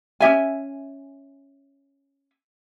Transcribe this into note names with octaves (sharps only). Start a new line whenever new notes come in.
C#4 D#4 E5 G#5